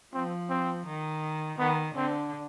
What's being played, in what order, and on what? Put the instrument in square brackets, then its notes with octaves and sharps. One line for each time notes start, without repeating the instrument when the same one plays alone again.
[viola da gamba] F3 [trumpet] C4
[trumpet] C4
[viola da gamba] D#3
[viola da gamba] D#3 [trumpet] B3
[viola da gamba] D3 [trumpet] C4